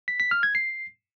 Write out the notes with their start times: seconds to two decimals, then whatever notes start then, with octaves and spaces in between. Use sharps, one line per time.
0.08 B6
0.20 B6
0.31 F6
0.43 G#6
0.55 C7